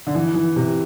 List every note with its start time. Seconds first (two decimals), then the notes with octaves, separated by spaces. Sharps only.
0.07 D3
0.15 E3
0.34 E3
0.56 C3